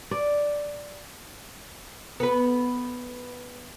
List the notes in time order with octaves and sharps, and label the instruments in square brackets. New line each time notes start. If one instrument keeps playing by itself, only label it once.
[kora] D5
[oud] B3 B4